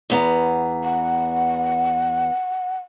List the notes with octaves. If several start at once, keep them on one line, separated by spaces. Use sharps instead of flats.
E2 B3 A#5
F#5